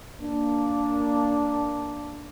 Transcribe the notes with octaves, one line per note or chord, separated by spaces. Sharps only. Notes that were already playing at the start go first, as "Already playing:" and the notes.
A#3 D4